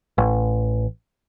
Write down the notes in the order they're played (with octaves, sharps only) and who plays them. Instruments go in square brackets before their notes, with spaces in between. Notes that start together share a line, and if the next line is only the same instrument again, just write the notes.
[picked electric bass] A1